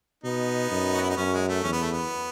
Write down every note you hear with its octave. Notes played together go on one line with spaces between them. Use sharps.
B2 B3 D#4
F#2
F#4
E4
D#4
F#2 C#4
G#3
A3
E2 C#4
B3
A3
B3